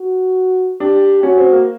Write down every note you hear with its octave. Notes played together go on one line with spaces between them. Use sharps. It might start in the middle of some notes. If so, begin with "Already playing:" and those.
Already playing: F#4
D4 G4
C#4 F#4
C4
A#3